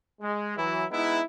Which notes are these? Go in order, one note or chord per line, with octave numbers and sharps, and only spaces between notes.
G#3
E3 F#3 E4
G#3 B3 D#4 E4